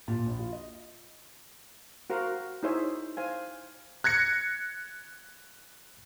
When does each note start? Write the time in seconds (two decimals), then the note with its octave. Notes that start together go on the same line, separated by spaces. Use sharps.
0.08 A#2
0.26 A#1
0.39 F4
0.53 D#5
2.10 F#4 A#4 C5 F5 F#5
2.63 D#4 E4 G#4 C5 C#5 E5
3.17 C5 F5 G#5
4.04 F#6 G#6 A#6 C#7